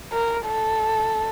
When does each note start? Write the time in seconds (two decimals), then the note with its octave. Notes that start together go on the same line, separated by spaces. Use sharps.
0.12 A#4
0.47 A4